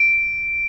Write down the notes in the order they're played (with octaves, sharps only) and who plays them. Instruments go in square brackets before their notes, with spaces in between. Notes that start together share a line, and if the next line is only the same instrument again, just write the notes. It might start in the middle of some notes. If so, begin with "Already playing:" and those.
Already playing: [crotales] D7